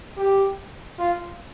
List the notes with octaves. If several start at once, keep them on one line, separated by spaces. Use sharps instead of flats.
G4
F4